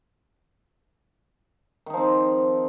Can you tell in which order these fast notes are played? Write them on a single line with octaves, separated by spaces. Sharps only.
D#3 D#4 F3 C4